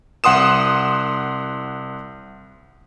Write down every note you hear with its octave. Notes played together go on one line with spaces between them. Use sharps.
C2 F#5 C6 D#6 E7